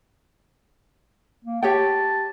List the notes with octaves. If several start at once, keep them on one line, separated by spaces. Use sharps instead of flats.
A#3
G4 C#5 G5 A5